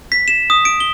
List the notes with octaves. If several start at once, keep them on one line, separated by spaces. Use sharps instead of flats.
B6
E7
D#6
D7
G7